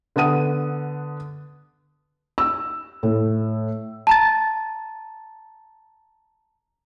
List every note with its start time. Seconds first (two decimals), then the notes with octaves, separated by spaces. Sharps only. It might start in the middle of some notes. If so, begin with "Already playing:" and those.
0.16 D3 B3 F#5 D#6 D#7
2.38 E6
3.03 A2
4.07 A5 A#5 A6